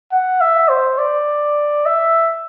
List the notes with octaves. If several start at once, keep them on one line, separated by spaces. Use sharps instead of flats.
F#5
E5
C5
D5
E5